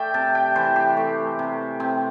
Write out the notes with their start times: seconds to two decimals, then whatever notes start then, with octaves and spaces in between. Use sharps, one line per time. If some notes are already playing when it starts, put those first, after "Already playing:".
Already playing: A3 D5 E5 G5
0.14 C3 A5
0.35 G5
0.56 E3 C5
0.76 G4
0.97 A3
1.39 C3
1.80 C3 C4